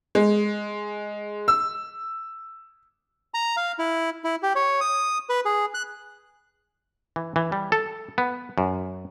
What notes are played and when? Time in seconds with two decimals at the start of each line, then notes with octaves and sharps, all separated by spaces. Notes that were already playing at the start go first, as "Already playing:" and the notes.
0.15 G#3
1.48 E6
3.34 A#5
3.57 F5
3.79 E4
4.24 E4
4.43 G4
4.55 C#5
4.81 D#6
5.29 B4
5.45 G#4
5.74 F#6
7.16 E3
7.36 E3
7.52 G3
7.72 A4
8.18 B3
8.58 F#2